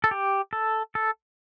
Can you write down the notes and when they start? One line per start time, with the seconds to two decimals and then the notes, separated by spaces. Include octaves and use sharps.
0.04 A4
0.11 G4
0.53 A4
0.95 A4